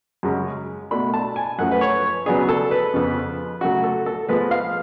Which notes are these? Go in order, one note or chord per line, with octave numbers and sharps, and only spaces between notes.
F#2 C#3 G#3 C#4
B2 A3 D4 B5
A5
G#5
F#2 F3 A3 C#4 F#5
B4
C#5
C#3 F#3 B3 D4 G#4
A4
B4
F2 C#3 F3 B3
C#3 F#3 A3 F#4
A4
A4
G#2 F3 G#3 B3 B4
F5